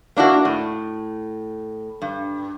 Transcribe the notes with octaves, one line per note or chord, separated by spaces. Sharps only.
A#3 D4 E4 F#4
A2
G2